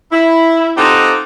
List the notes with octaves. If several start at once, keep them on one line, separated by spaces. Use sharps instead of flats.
E4
C4 D#4 F4 G4 A4 F#5